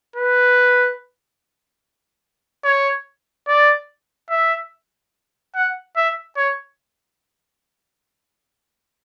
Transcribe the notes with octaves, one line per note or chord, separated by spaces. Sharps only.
B4
C#5
D5
E5
F#5
E5
C#5